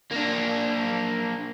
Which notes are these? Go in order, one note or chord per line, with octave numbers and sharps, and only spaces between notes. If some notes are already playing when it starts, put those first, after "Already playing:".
A#3 D4